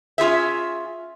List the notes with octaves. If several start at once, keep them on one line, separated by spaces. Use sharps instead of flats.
C#4 F4 G#4 E5